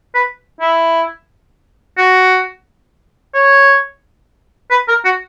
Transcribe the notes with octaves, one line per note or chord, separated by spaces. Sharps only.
B4
E4
F#4
C#5
B4
A#4
F#4